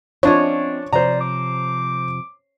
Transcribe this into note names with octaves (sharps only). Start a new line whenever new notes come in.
F3 C4 D4 F4 C#5 D#5
C3 F3 C5 D5 A#5
D6